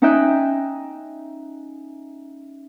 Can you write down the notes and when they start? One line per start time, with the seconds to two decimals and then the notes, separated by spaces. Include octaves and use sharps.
0.02 C#4 D#4 D#5 E5 G5 F#6